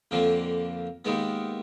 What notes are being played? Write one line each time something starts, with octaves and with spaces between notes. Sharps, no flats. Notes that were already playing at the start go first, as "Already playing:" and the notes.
F2 D3 F3 A#3
D#2 D#3 G#3 B3